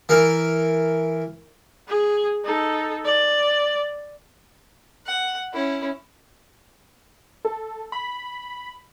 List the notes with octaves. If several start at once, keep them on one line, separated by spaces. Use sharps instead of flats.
E3 A#4
G#4
D#4 A4
D5
F#5
C#4 E4
A4
B5